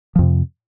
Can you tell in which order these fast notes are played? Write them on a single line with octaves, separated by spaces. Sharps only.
F3 F2 C3